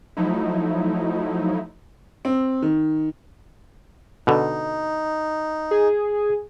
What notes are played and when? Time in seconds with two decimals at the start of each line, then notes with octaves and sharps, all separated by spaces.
0.17 F3 F#3 A3 D#4 E4
2.25 C4
2.62 D#3
4.27 B2 D3 D#4
5.71 G#4